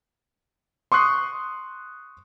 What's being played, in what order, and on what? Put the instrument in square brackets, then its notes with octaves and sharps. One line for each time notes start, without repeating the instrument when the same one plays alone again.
[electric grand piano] C6 C#6 D#6 F#6 C7